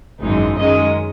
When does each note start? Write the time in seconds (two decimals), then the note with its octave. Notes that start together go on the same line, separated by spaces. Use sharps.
0.22 G#1 F#2 E3 G#3 D#4
0.57 F#2 D#3 G#3 C#4 D#5